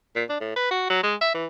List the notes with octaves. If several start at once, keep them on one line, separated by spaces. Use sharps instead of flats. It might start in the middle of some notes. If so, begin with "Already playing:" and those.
A#2
D4
A2
B4
F#4
F#3
G#3
E5
E3